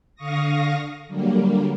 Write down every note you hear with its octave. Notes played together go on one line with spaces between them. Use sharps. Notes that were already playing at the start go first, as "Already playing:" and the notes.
D3 F5 C#6 D#6 A#6
D3 F#3 G3 A#3